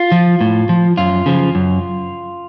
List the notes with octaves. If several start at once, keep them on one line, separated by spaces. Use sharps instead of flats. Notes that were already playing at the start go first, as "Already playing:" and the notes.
Already playing: F4
F3
A2
F3
F#2 F4
C#3 F3
F#2